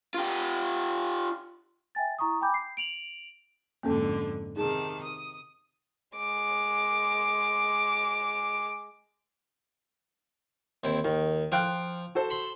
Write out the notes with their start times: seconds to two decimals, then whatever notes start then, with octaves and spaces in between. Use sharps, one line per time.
0.14 F4 G4
1.95 E5 G5 G#5 A6
2.19 E4 A#5 C#6 D#6
2.41 G5 G#5 B5 D6 G6
2.54 C7
2.77 D7 F7 F#7
3.83 F2 G#2 D3 A#3 C#4 A4
4.56 C3 D#3 D#4 G#4 A5
5.03 D#6
6.16 G#3 D6
10.84 D#2 C4 E4
11.04 D#2 D#3
11.52 F3 F5 G5 F#6
12.15 F#4 A4 C5
12.30 B5 C6